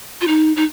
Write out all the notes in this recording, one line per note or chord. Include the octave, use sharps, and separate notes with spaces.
F4
D#4
D#4